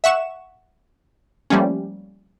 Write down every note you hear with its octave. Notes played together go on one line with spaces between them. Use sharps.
E5 F#5 C#6 E7
F3 G3 A3 A#3 C#4